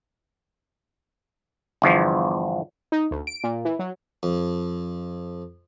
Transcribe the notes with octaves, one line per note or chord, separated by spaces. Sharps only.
G1 E2 F3
D#4
D2
D7
A#2
E3
F#3
F2